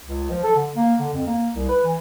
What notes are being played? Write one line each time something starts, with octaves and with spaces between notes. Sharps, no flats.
C#2
F3
A4
D3
A#3
D3
F2
A#3
C2
B4
E3